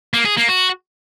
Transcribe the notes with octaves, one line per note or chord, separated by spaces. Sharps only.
A#3
G#4
A#3
F#4